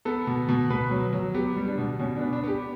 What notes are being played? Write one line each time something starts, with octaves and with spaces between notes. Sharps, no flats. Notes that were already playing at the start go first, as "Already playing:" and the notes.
B3 A4
B2
B2
B2 B4
F#3
F#3
B3 G4
G3
D4
B2
B2 C#4
D4
B3
D4
B3 G4